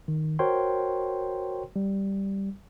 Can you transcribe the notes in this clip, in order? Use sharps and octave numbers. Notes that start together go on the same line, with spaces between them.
D#3
F#4 A#4 C5 C#5 G5 C6
G3